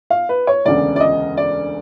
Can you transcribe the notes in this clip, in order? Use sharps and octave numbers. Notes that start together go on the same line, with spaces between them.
F5
B4
C#5
E1 D2 C#3 D5
D5
D#5
D5